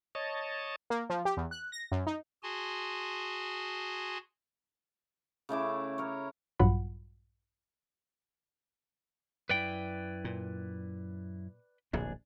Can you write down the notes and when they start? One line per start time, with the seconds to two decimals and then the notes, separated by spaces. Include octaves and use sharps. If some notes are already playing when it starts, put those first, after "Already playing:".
0.15 C#5 D#5 A5
0.90 A#3
1.10 F3
1.25 G4
1.37 E2
1.51 F#6
1.72 A#6
1.92 F#2
2.07 D#4
2.43 F#4 G#4 G#5 A5 C6
5.49 C#3 A3 E4 D6
5.98 A#4 C#5
6.59 A#1 G2 F#3 F4 F#5 B5
9.49 F#2 E4 B4 D5 G5
10.25 A#2
11.93 D1 A#1 C3 D4 G#4